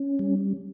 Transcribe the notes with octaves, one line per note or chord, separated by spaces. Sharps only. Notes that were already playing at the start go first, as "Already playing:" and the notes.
Already playing: C#4
G3